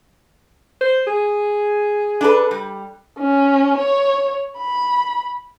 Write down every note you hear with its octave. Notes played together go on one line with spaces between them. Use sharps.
C5
G#4
D4 A4 B4
G3
C#4
C#5
B5